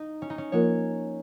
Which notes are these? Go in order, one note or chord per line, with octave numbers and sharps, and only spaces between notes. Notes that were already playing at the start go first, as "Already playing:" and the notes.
Already playing: D#4
C#4
D#4
C#4
F3 A#3 F4 A#4 C#5